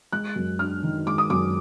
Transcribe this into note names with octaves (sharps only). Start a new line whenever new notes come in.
G#3 F#6
F#2
D4 F6
D#3
G#3 D6
D#6
F#2 D6